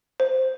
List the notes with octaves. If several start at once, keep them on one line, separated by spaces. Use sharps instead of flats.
C5